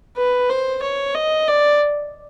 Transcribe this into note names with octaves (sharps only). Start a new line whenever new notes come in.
B4
C5
C#5
D#5
D5